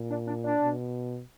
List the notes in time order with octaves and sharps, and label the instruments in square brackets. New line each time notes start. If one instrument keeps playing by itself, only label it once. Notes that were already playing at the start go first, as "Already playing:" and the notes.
Already playing: [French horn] A#2
[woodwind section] D4
D4
D4
[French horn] B2